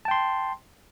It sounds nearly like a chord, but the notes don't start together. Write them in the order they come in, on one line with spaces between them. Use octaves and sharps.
A5 G5 C6